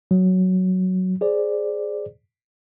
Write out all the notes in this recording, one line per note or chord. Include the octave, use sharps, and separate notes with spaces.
F#3
G#4 C5 D5